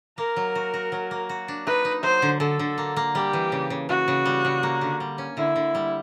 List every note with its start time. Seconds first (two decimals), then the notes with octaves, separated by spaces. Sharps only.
0.18 A#3 A#4
0.36 F#3
0.55 F#4
0.74 F#4
0.92 F#3
1.11 A#3
1.29 F#4
1.48 D4
1.67 D#4 B4
1.85 D#4
2.03 F#3 C5
2.22 D3
2.40 D3 A4
2.59 D3
2.78 A#3
2.97 A#3
3.15 G3 G4
3.33 E3
3.52 C#3
3.70 C#3
3.89 C#3 F#4
4.08 C#3
4.26 G3
4.45 C#3
4.63 A#3
4.81 D3
5.00 G3
5.18 C#4
5.37 D3 E4
5.56 D3
5.75 G3